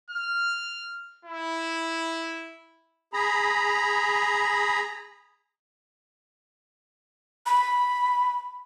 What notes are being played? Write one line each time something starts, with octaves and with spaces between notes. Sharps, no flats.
F6
E4
G#4 A#5 B5
B5